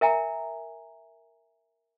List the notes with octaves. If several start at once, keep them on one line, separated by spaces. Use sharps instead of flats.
A#4 E5 G#5 A#5